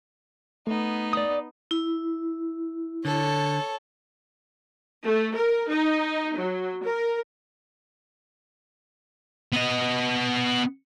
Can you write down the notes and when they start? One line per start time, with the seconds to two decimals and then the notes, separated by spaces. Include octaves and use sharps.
0.67 A3 B3 D#4
1.13 D5 D#6
1.71 E4
3.05 D3 A4 C#5
5.06 A3
5.36 A#4
5.70 D#4
6.37 F#3
6.84 A#4
9.53 B3 D#5